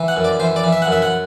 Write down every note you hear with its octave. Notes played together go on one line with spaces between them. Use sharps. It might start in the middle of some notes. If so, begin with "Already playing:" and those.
Already playing: E3
F#5
F#2
D5
E3 C5
D5
E3
E5
F#5
F#2 E5
F#5